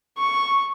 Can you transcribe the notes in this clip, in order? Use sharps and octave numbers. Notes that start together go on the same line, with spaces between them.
C#6